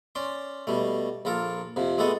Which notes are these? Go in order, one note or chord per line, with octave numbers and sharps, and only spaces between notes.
C#4 D5 C6
B2 G3 A3
A#1 F4 A4 A#4
F2 C3 F3
G#3 A3 B3 A4 D#5